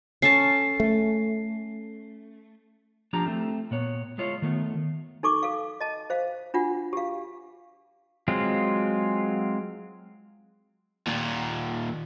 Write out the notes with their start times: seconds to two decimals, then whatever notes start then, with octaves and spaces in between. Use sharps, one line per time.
0.22 C#4 A4 A5 C7
0.80 A3
3.13 F3 D4 F4 G4 A#5
3.26 A3 C4
3.71 A#2 B3 C#5
4.18 G#3 E4 F4 C#5
4.42 D#3 A3 B3
5.23 D#4 A4 C#6 D6
5.43 A4 F5
5.81 D#5 A5
6.10 C5 F5
6.54 D4 F4 F#5
6.93 G4 F5
8.28 F#3 G#3 C4 F4
11.07 D#2 A#2